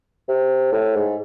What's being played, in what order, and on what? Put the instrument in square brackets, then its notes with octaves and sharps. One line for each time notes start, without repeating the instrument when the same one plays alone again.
[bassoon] C3
A2
G#2